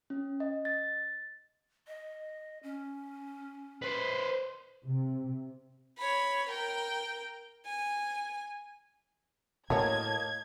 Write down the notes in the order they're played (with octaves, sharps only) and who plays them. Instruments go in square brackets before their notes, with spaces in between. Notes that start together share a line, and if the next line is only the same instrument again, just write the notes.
[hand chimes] C#4
D#5
A6
[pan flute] D#5
C#4
[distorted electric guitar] B4 C5
[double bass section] C3
[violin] C#5 B5
A#4 G5
G#5
[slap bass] A2 [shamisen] F#3 C#5 [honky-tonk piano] A#3 D#5 A5 [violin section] G#6